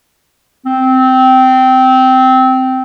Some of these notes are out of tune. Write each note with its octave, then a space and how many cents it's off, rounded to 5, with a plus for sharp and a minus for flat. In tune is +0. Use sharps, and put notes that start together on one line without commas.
C4 -15